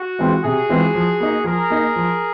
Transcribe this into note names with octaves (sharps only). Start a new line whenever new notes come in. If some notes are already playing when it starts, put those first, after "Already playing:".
Already playing: F#4
E3 G#3 C4 F4
C3 F#4 G#4
E3 G#3 C4 F4
F3
A#3 D#4
F3 G#4 A#4
A#3 D#4
F3